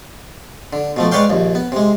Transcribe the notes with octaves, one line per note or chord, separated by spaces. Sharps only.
D3
B2 F3 A3
G#3 B4 C#5 D5 F5 G5
A#1 D#2
B3
C3 G#3